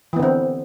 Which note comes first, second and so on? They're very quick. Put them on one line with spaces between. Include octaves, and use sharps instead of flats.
E3 B3 D3 C4